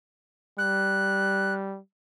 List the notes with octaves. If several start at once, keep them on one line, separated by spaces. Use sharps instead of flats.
G3 F#6